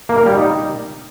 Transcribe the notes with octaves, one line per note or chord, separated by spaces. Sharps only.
A#3
A#4
G3
D#4